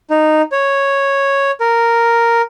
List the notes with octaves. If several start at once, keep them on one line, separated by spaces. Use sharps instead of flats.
D#4
C#5
A#4